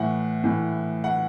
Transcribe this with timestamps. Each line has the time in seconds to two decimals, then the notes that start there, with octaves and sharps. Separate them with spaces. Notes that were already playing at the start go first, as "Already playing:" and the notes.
Already playing: A2 E3 F#5
0.44 A2 E3
1.04 F#5